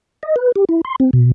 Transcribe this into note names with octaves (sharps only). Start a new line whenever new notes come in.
D#5
B4
G4
E4
C6
C4
B2